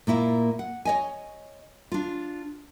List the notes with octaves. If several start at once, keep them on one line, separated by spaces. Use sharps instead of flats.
A#2 A#3 E4 F4
F#5
C#5 D#5 G#5
D4 F4